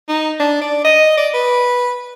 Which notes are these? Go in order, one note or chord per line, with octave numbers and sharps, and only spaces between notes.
D#4
D4
D5
D#5
D5
B4